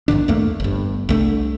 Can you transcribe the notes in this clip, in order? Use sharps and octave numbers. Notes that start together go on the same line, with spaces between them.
A#1 G#2 D#3 D4
E2 A3 A#3
G1 G2
C2 A3 D4